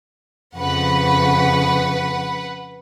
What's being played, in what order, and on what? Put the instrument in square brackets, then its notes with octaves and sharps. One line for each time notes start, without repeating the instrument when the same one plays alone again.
[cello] F2 C#3 [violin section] B4 F#5